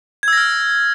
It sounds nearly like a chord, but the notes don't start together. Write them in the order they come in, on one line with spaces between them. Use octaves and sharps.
G#6 E6 A#6 F6